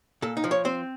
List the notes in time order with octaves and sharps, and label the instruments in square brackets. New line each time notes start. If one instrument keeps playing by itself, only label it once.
[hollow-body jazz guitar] A#2 A4
D#4
F3
C#5
C4 C5